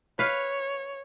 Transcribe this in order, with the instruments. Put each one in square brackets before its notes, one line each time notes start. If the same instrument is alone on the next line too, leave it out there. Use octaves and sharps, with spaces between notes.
[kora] B4 F5 [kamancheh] C#5